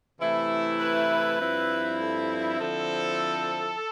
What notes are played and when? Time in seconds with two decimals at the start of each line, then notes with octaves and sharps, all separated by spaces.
0.19 C3 E3 A3 E4
0.80 B4
1.39 G2 F3 C4 E4
1.99 A4
2.59 D3 F3 C4 E4 A4